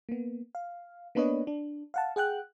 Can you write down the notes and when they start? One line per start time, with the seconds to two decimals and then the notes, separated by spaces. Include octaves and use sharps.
0.09 A#3 B3
0.55 F5
1.15 A#3 B3 D4 B4 C#5 D#5
1.47 D4
1.94 F5 F#5 A5
2.16 G#4 F#5 G5 F#6